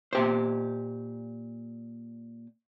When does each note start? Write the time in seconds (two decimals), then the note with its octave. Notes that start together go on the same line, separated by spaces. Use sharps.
0.13 A#2 G4 C5